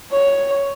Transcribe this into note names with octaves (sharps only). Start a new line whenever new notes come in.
C#5